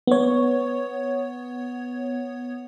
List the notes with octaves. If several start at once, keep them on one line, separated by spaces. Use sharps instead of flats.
B3 C#5